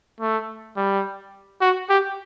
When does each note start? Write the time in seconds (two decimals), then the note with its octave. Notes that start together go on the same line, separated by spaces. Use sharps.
0.21 A3
0.77 G3
1.61 F#4
1.90 G4